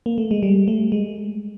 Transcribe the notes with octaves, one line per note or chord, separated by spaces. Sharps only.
A#3
A3
G#3
G3
A3
G#3